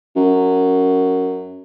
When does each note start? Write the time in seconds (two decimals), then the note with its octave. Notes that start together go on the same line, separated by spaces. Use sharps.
0.16 F#2